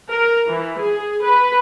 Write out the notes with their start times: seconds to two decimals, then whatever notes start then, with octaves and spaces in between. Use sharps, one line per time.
0.10 A#4
0.47 E3
0.79 G#4
1.22 B4